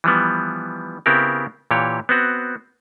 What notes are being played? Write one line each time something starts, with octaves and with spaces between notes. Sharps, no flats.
E3 F3 G3 B3
C#3 B3 C4 E4 G4 A#4
A#2 E3 G4 C#5
B3 C4 F#4